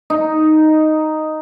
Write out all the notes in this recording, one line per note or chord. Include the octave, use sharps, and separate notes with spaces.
D#4